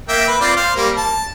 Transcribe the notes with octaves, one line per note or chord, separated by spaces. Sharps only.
A#3 E5 G5
B4
C4 F4 D5
C5 F5
G3 A#3
A5